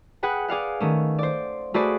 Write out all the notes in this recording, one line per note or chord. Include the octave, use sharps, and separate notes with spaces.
G#4 B4 F#5 G5
G#4 D5 F5 F#5
D#3 A3 C#4
C5 D5
A3 F#4 G#4 B4 C5 D5